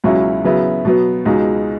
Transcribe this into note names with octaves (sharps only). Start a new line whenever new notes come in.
C#2 B2 F#3 C#4 E4
C#3 F#3 B3 E4
B2 F#3 B3
C#2 B2 G#3 D#4